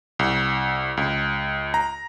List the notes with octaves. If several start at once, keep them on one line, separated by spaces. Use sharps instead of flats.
C2
C#2
A#5